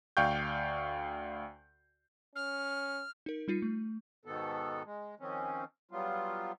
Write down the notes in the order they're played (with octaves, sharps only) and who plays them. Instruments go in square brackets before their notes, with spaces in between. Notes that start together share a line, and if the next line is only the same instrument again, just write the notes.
[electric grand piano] D2 D5 F5 G5 C#6 G6
[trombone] C#4 [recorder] F6
[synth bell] D#4 A#4
G3 D#4 F4 C7
A3
[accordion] G#2 B2 D#3 B3 A4
G#3
D#3 F3 C4 C#4
F#3 G3 B3 F4